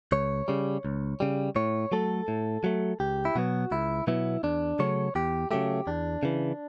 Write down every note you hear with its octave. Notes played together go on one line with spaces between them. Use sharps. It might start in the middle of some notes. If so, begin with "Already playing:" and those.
C#2 C#5
C#3 G3
C#2
C#3 G3
A2 C#5
F#3 A3 A4
A2
F#3 A3
C#2 G4
E4
B2 F#3 B3 F#4
C#2 E4
B2 F#3 B3 E4
E2 D4
C#3 F#3 A3 C#5
E2 G4
C#3 F#3 A3 G4
E2 D4
C#3 E3